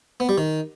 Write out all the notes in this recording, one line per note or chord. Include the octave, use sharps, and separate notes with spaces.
B3
G3
D#3